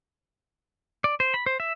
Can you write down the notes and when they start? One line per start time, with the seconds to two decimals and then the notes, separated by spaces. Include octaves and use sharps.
1.04 D5
1.20 C5
1.34 B5
1.46 C5
1.60 E5